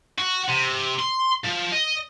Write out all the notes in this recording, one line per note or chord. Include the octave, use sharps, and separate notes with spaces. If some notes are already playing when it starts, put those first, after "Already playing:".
F#4
C3
C6
F3
D#5